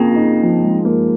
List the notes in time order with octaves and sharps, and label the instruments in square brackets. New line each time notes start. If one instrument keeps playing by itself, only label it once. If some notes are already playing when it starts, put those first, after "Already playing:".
Already playing: [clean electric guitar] F2 C#3 A#3 [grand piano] F4 G#4
[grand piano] F4
D#4
F3
G#3
A#3